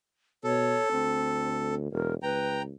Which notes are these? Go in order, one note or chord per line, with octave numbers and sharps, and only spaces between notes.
B2 A4 C#5
D2 C4
E1 A#4
C#2 B4 G5 A#5